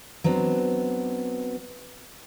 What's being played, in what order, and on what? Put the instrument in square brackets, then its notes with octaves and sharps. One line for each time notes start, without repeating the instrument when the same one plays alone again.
[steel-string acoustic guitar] F#3 B3 C4 D4